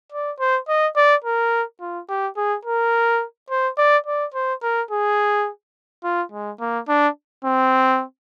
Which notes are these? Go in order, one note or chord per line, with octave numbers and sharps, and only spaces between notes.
D5
C5
D#5
D5
A#4
F4
G4
G#4
A#4
C5
D5
D5
C5
A#4
G#4
F4
G#3
A#3
D4
C4